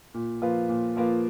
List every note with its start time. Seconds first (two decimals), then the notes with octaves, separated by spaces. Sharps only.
0.14 A#2
0.42 F3 A#3 F4 B4
0.69 A#2
0.96 F3 A#3 F4 B4